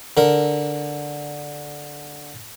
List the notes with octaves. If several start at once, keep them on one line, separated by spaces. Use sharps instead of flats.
D3 A#4